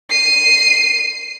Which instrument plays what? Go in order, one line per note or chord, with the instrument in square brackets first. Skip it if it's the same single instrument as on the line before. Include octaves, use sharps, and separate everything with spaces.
[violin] C7 D#7